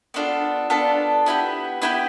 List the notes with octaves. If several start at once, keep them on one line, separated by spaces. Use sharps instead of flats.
B3 D4 F4 A4
B3 D4 F4 A4
B3 E4 G4 B4
B3 E4 G4 B4